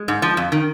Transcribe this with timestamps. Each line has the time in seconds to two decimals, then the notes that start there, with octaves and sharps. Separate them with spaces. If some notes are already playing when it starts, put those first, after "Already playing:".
Already playing: G#3
0.08 G#2
0.22 F3
0.37 F2
0.52 D#3